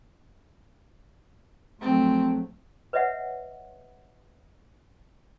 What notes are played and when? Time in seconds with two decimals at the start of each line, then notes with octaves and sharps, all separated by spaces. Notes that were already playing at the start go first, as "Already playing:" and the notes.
1.81 A#1 F#3 A3 C4
2.93 B4 C#5 D#5 E5 F#5